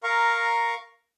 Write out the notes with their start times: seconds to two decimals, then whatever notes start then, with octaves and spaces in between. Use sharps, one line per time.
0.03 A#4 F5 A#5 C#6